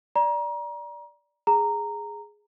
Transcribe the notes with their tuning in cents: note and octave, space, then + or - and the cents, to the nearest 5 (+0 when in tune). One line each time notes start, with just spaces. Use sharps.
D5 +0 A#5 +30
G#4 +0 A#5 -10